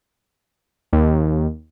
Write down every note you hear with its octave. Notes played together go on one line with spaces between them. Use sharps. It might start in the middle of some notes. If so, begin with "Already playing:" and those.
D#2